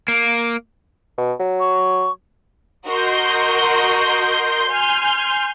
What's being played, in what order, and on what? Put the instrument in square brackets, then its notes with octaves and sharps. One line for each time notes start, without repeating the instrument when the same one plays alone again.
[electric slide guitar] A#3
[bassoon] B2
F#3
[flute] C#6
[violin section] F#4 A#4 D#5 [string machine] C6 G6
[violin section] G#5 F6